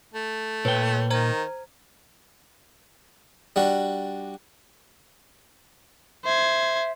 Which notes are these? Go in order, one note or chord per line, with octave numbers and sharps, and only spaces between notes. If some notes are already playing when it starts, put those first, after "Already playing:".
A3
A#2 B4 C#5 G5
D#3 C5 A#5 G#6
G3 D4 F#4
C5 E5 G#6